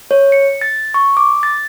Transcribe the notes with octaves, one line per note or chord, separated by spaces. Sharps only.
C#5
C#7
A6
C#6
D6
A6